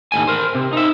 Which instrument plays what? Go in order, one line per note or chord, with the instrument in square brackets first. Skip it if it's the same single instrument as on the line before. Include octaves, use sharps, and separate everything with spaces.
[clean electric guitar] D#2 A2 G#5
A#4 C5
C3
D#4 E5